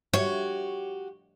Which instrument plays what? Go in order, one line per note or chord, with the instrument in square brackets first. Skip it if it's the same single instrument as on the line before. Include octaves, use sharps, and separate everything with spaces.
[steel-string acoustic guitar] F#4 G4 [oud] C#5